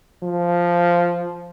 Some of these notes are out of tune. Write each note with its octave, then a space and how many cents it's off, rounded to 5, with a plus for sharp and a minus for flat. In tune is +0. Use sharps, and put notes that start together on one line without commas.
F3 -5